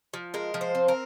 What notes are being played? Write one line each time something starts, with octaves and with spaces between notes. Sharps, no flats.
F3
G#3 A#4
F3
C5
C4
A#4